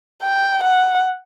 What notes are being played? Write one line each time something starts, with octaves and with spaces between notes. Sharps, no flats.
G5
F#5